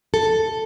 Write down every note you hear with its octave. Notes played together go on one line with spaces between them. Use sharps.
A4